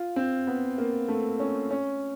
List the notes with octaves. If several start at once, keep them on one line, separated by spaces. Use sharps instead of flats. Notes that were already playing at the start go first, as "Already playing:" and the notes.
Already playing: F4
C4
B3
A#3
A3
C#4
C#4